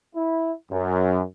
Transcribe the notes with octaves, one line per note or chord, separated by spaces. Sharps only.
E4
F#2